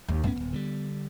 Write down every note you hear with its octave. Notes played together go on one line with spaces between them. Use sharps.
D#2
F#2 A2 B3 C#4
D#1 A#1
D3 E3 G3